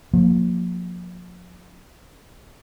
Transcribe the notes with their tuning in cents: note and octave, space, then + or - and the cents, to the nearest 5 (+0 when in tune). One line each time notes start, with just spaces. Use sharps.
F3 +40 A#3 +0